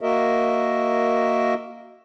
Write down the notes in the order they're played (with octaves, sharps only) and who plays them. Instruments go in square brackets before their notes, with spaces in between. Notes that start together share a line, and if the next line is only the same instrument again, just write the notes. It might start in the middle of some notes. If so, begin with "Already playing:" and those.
[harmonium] A#3 F#4 A#4 D#5 E5